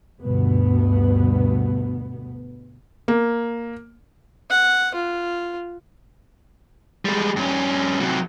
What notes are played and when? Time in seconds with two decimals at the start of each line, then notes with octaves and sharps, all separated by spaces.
0.21 D2 G2 B2 B3
3.08 A#3
4.50 F#5
4.94 F4
7.05 G3 G#3
7.36 G2 C#4
8.00 C3 F#3